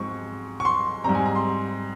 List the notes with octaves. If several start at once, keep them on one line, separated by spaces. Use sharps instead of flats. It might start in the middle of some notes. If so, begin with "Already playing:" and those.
Already playing: G#2 F3 G#3 C4 C#6
C#6
C6
G#2 G3 C4 A#5
G#5
A#5
C6